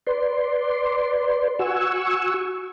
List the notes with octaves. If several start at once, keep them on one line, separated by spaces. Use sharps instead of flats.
B4 D5 C6
F#4 F#5 G#5 C#6 E6